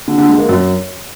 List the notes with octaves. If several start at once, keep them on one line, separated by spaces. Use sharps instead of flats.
D3
D3
G#3
A#3
F#2